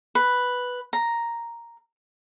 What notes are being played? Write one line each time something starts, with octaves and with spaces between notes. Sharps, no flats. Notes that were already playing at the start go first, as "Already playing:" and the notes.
B4
A#5